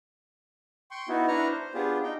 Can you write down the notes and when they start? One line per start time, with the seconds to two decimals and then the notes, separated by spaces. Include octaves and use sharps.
0.91 G5 C6 C#6
1.08 B3 D#4 E4 F#4
1.28 D4 E4 B4 A#5 C#6 F6
1.48 C5
1.74 B3 D4 F4 G4 G#4
2.03 D#4 G5